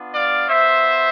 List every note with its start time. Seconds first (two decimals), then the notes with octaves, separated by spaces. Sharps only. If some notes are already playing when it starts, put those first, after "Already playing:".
Already playing: B3 D4 F4
0.13 D5 F5
0.49 B3 F4 C5 E5